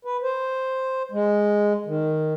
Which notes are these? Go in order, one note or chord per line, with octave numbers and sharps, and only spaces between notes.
B4
C5
G#3
D#3